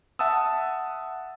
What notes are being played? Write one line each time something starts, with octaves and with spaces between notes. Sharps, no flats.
E5 F#5 A5 D#6 E6